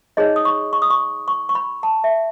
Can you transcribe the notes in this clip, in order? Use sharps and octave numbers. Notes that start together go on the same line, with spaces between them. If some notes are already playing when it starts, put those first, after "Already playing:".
D#4 G#4 C#5 D#5
D#6
C#6
C#6
D#6
C#6
C#6
C#6
B5
A5
E5